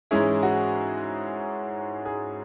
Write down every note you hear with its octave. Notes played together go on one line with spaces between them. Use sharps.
G#2 E3 G#3 C#4 E4 G#4
F#4
G#4